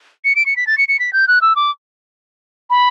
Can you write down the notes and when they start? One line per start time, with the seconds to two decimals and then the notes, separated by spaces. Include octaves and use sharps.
0.25 C#7
0.36 D7
0.46 C#7
0.56 B6
0.67 A6
0.78 C#7
0.88 C#7
0.99 B6
1.13 G6
1.28 F#6
1.41 E6
1.56 D6
2.70 B5